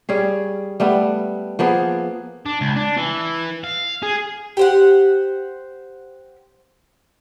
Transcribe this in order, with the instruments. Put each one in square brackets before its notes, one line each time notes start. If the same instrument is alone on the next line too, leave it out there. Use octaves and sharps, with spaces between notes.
[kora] G3 C#4 G#4
G3 A3 B3
F3 A#3 B3 G#4
[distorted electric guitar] D4
C#2
D4
E3
F5
G#4
[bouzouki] G4 C5 F#5